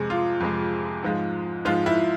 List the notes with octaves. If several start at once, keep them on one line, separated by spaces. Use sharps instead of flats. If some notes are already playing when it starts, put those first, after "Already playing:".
Already playing: F2 C3 G#3 G#4
F4
F2 C3 G#3
G#2 F3 G#3
G#2 F3 G#3 F4
E4